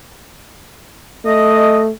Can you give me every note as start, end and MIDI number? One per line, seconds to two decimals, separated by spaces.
1.25 1.90 57
1.25 1.82 75